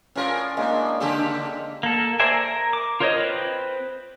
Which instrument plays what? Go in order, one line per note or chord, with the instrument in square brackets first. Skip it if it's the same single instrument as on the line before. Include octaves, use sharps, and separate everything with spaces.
[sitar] A2 A#4 [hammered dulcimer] C#4 F4 D5
[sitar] A2 [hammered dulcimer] G#3 A#3 D4
[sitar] C#3 G4 A4
[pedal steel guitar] A#3 A4
A#4 C5 D5 E5 G#5
A#4
D6
F4 A#4 C5 C#5 D#5
C4 B4 C5